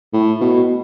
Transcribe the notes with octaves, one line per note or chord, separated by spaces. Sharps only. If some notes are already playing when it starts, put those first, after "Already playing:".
A2
B2